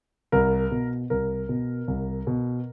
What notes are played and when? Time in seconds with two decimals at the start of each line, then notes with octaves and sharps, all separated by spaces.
0.32 C2 A#4
0.71 B2
1.10 C2 A#4
1.49 B2
1.88 C2
2.27 B2